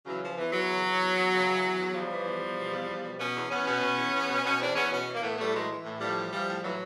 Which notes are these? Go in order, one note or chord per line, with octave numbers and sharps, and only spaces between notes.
C#3 E3 F#3
E3 F3
E2 E3
E2 E3 F#3
C#3
E3
E2
E2
C#3
E3
E2
E2
C#3 F3 G3
E3
E2
E2
B2
E2
E2
B2
B2 B3 C#4
E2
E2 B3 C#4
B2
B2
E2
E2
B2
B2 B3 C#4
E2 C4 D4
E2 B3 C#4
B2 B3 C#4
E3
A#3
A2 A3 B3
A2 G3 A3
E3 F#3 G#3
E3
A2
A2 F3 G3
E3
E3 F3 G3
A2
A2 E3 F#3